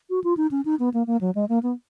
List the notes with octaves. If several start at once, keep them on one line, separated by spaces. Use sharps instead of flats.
F#4
F4
D#4
C#4
D#4
B3
A#3
A#3
F#3
G#3
A#3
B3